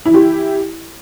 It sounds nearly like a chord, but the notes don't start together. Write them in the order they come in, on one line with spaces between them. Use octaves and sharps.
E4 E3 G4